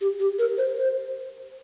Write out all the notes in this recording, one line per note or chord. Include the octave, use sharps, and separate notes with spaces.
G4
G4
A#4
C5
C5